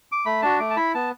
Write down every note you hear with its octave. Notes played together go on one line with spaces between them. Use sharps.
D6
A3 B5
D4 F#4 A5
A3 D6
A5
E4 B5
B3 A5